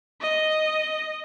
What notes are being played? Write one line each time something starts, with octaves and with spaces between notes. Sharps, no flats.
D#5